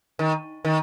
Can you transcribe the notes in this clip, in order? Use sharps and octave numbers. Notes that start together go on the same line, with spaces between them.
D#3
D#3